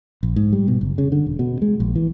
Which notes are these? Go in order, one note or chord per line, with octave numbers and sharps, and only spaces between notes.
A#1
G#2
G3
B2
F#1
C#3
D3
E1
B2
G#3
A#1
E3